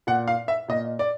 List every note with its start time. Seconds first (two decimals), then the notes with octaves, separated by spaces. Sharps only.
0.07 A#2 F#5
0.28 F5
0.48 E5
0.68 A#2 D#5
0.99 D5